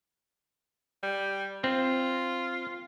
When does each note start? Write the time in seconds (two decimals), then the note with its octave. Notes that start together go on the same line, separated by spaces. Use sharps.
1.03 G3
1.64 C4 F4